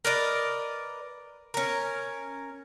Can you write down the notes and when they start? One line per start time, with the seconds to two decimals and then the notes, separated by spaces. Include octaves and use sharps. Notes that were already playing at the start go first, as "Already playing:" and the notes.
0.05 A#4 B4 D5 D#5
1.54 C#4 A#4